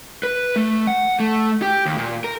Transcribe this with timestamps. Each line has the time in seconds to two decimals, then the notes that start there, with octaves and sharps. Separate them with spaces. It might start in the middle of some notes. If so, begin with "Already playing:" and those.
0.23 B4
0.56 A3
0.87 F#5
1.20 A3
1.62 G4
1.86 D#2
1.98 A#2
2.24 A#4